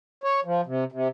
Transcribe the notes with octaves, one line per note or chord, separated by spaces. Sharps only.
C#5
F3
C3
C3